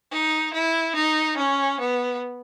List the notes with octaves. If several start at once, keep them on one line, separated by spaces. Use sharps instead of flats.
D#4
E4
D#4
C#4
B3